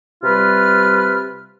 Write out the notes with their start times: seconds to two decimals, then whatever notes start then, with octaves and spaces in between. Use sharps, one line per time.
0.23 C3 G3 F4 B4 F6